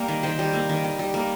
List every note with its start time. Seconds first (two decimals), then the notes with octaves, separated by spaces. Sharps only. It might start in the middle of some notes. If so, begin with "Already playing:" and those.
Already playing: G3 A#3
0.08 D#3
0.23 D#3 C5
0.39 G3
0.53 A#3
0.69 D#3
0.84 D#3
0.99 G3
1.14 A#3